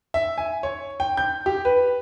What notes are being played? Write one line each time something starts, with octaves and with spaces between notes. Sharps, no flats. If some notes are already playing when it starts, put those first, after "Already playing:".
E5
G#5
C#5
G5
G6
G4
B4